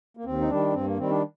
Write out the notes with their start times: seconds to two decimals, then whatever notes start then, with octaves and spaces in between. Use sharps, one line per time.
0.17 A#3
0.25 D#2 C4
0.41 D#4
0.49 D#3 G3 D4
0.73 G2 C4
0.85 A#3
0.98 D#3 G3 C4
1.10 D4